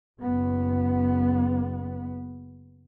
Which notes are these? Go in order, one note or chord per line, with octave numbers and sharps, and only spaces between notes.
F#1 B3